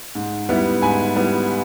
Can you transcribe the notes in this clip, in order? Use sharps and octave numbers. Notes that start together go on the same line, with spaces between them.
G#2
G3 B3 E4
G#2 G#5 B5
G3 B3 E4